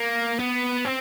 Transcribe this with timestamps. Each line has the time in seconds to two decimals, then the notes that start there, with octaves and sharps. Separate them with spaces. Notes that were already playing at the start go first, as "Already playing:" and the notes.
Already playing: A#3
0.39 B3
0.85 C4